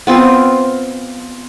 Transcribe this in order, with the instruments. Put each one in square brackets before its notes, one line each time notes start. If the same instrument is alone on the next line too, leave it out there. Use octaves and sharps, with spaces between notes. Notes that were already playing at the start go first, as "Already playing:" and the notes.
[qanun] B3 C4 F4